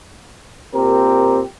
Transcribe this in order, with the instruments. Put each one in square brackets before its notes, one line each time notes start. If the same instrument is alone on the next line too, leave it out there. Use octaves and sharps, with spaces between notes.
[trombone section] A#2 C4 G4 A#4